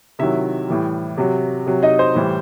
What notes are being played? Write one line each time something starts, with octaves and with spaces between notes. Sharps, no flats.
C3 D#3 F#3 E4 E5
A2 E3 G3
C3 F#3
C3 F#3
D#4 D#5
C5
A2 E3 G3